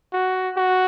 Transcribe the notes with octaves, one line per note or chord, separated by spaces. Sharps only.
F#4
F#4